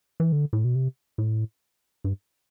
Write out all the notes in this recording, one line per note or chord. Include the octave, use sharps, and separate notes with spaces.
E3
D3
A2
B2
C3
A2
G2